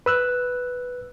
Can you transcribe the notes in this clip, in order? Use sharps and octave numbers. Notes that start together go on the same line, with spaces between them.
B4 E6 F#6